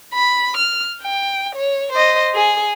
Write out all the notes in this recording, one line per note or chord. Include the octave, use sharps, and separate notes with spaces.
B5
F6
G5
C#5
C5 D#5
G#4